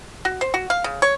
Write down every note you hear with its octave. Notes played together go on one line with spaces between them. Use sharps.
F#4
C5
F#4
F5
C#3
C#5